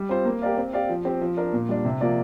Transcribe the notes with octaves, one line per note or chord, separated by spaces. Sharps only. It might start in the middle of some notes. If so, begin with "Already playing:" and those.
Already playing: G3
C4 F4 C5
A#3
G4 A#4 D5 F5
C4
G4 D5 F5
F3
C4 G4
F3
D4 A#4
A#2
G3 D4
C3
F3 A#3 F4 D5